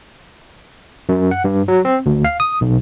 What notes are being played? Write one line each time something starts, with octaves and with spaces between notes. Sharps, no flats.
F#2
F#5
G2
F#3
C4
D2
F5
D#6
B1